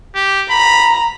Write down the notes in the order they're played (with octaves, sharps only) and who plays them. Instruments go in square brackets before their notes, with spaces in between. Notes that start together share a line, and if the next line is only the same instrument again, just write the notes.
[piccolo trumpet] G4
[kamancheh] A#5 [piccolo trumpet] B5